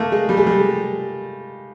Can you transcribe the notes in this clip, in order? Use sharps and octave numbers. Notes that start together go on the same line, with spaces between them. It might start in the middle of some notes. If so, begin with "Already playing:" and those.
Already playing: A3 A#3
G#3
G3
G#3
G3